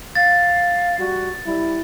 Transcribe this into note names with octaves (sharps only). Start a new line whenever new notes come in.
F5 A6
G3 F#4
G3 E4